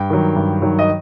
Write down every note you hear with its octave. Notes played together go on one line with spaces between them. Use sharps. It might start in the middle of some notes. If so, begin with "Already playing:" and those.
Already playing: G2 G5
D#3 F#3
G2
D#3 F#3
D#5